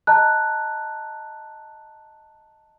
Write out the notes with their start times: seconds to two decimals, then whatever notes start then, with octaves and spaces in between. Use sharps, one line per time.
0.07 D#5 A5 A#5 F#6